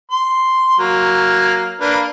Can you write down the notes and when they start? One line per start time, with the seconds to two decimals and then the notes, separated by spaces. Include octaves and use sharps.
0.11 C6
0.79 F#3 A#3
1.81 A#3 D4 B4